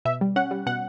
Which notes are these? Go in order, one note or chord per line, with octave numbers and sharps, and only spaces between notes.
B2 E5
G3
C#4 F#5
G3
B2 F#5